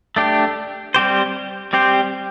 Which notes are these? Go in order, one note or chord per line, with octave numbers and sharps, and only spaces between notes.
A3 D4 G4
G3 C4 G4 C5
G3 C4 G4 C5